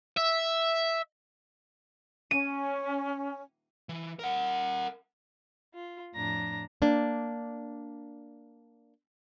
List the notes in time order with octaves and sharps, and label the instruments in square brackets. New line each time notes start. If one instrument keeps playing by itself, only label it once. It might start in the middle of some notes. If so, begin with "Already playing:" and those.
[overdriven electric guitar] E5
[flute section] C#4 [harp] D#7
[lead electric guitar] E3
A#4 F#5
[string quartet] F4
F2 A2 D4 A#5 A#6
[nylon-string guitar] A#3 D4